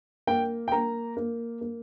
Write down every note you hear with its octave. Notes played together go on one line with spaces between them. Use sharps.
A#3 G5
G5
A#3 A#5
A#3
A#3